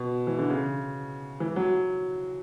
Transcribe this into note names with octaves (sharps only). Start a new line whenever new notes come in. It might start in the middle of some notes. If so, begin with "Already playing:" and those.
Already playing: B2
E3
D3
C#3
E3
F#3